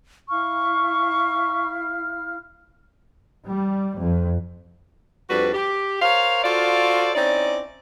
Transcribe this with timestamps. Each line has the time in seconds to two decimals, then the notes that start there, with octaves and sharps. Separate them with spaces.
0.29 E4 F5 C#6 F6
3.47 G3
3.99 F2
5.30 F2 G3 D4 F#4 B4
5.54 G4
6.02 A#4 C5 C#5 F5
6.44 F4 F#4 A4 C5 D5 F5
7.15 C4 C#4 D#4 E4 D5